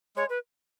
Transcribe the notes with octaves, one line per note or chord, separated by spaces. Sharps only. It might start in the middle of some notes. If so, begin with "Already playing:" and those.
G#3 C#5
B4